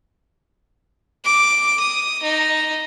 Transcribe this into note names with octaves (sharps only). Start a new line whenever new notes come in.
D6
D#6
D#4